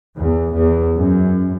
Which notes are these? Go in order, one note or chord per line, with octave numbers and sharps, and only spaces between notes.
E2
E2
F#2